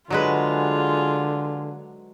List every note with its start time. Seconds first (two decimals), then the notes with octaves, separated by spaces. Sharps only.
0.10 D3 F#3 G#3 F4 G#4 B4